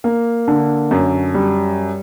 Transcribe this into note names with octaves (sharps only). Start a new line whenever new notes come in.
A#3
D3
F#2
G3